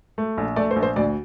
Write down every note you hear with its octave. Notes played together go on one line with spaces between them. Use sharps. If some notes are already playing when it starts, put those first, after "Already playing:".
A3
A#1
A3 D5
C5
A#1
C5
D2 D5